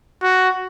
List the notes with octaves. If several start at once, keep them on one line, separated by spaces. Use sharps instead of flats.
F#4